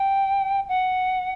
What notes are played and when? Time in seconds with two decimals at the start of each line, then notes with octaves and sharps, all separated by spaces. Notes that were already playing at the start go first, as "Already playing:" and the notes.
Already playing: G5
0.69 F#5